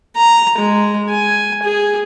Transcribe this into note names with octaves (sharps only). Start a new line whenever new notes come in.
A#5
G#3
G#5
G#4